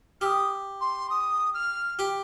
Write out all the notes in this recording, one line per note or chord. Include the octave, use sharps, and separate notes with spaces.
G4 D#6 F6
C6
D#6
F6
G4